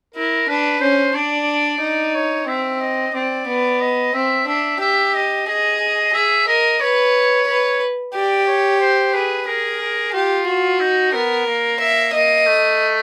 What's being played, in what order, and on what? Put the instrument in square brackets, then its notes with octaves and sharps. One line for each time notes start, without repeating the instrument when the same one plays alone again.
[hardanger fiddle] E4 [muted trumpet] A#4
[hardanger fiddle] D4 [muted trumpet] B4
[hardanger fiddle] C#4 [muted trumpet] C5
[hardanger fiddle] D4 [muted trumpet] D5
[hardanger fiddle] D#4
[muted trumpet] C#5
[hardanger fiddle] C4 [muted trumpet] E5
[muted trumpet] D#5
[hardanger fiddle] C4 [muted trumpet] D5
[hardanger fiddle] B3
[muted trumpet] D#5
[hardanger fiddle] C4 [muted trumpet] E5
[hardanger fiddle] D4 [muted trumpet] E5
[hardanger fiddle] G4 [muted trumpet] E5
[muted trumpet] D#5
[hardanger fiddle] G#4 [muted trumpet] D#5
[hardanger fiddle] G#4 [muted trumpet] E5
[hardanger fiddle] A#4 [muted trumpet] D#5
[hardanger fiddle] B4 [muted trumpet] C#5
[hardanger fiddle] B4
[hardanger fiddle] G4 [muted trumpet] D5
[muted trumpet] C#5
C5
[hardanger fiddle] G#4 [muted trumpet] B4
[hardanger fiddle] G#4 [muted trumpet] A#4
[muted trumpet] A#4
[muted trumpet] F4 [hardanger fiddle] G4
[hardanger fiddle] F#4
[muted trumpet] D#4
[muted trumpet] B3 [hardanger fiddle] A#4
[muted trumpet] A#3
[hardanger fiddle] E5
[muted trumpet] A#3 [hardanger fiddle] D#5
[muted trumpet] A3